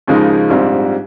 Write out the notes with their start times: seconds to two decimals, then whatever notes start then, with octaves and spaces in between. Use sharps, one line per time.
0.07 D#2 C#3 F3 G#3 D#4
0.50 A#1 G#2 G3 C4 F4